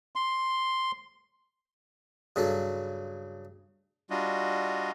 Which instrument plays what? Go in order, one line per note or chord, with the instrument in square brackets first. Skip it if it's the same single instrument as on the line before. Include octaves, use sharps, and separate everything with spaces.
[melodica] C6
[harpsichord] G2 C#3 F#3 A4
[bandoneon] G3 D4 F4 F#4 D#5